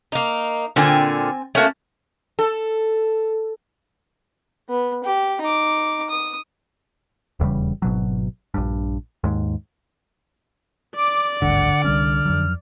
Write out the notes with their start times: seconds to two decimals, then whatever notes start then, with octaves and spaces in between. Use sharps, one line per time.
0.12 A#3 D#4
0.76 A#2 D3 C4 G#5
1.55 A3 A#3 C#4 F#4
2.39 A4
4.70 B3
5.04 G4
5.41 D#4 D6
6.10 D#6
7.40 D#1 E2 C#3 G3
7.82 G#1 B2 F#3
8.54 A#1 G2
9.24 D#2 G#2
10.96 D5 D6
11.42 G#1 D2 G2 D3 F#5
11.84 C2 G3 C#4 F6
12.25 F2 F#3